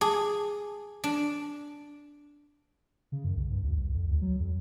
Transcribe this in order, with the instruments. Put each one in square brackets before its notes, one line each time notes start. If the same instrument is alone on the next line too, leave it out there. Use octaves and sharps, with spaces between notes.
[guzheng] G#4 [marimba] G#5 A5 D6
[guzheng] D4
[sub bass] C#3
F#2
C2
G2
D2
C2
F2
D2
F#3
F2